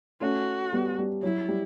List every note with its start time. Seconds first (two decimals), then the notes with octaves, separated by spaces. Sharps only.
0.21 A3 C#4 F#4
0.73 G3 B3
0.98 G3
1.23 F#3 E4
1.48 G3